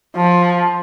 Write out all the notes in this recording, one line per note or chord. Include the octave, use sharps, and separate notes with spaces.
F3